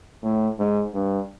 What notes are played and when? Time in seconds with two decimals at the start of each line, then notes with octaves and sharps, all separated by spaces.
0.23 A2
0.59 G#2
0.94 G2